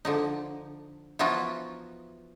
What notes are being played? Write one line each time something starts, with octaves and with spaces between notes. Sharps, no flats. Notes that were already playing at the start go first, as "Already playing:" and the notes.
D3 F3 D#4
E3 F3 B3 D#4 F4 F#4